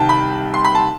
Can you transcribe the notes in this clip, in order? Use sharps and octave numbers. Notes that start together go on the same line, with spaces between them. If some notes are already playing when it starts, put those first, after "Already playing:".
Already playing: C2 C3 D#3 G5 A5
B5
C6
B5
A5